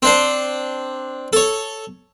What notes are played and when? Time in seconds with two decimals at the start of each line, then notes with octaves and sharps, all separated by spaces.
0.02 C4 D4 C5
1.33 A4 C#5